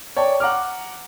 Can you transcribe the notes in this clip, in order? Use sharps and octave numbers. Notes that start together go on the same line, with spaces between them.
C#5 D5 G5 A5
F#5 A#5 D6 F6